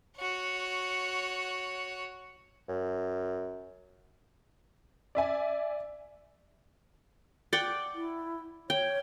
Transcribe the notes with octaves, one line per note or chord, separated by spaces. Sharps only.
F#4 C#5
F#2
D5 E5 G#5
D5 F#5 G5
E4
C#5 G5